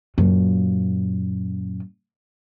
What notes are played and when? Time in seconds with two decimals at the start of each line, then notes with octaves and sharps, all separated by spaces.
0.18 F#2 A#2